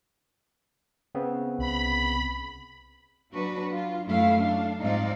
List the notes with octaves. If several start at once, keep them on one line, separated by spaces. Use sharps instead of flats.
C#3 B3 C4
C2 B5
F#3 D4 F#4 B4
F4
F#2 A3 E4 F5
D4 F5
G#2 F3 C4 D#4 D5 F5